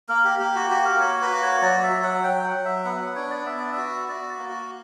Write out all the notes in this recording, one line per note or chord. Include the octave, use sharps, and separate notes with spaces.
A#3 A#4
G4
A#3 G4
F#4
F#4 G4
A#4
A#3 C#5
B4
F#4
C#5
F#3 D5
E5
F#3
F#5
F#3 G5
F#5
F#3
E5
B3 F#5
F#5
D4 C#5
D5
B3 E5
D5
F#4 E5
F#4 D5
A#3
F#4